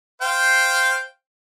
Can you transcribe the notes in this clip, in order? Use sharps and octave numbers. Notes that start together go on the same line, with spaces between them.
C5 F5 G5